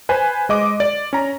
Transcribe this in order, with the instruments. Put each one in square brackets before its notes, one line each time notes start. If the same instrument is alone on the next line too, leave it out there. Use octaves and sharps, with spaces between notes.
[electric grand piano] B4 C5 G#5
G#3 D#5 D6
D5
C#4 A#5